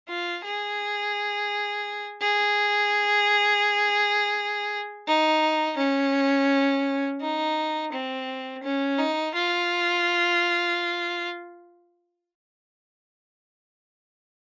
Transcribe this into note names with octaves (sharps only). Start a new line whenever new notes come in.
F4
G#4
G#4
D#4
C#4
D#4
C4
C#4
D#4
F4